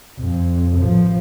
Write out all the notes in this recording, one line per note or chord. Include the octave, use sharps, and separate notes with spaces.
F2
A1 F3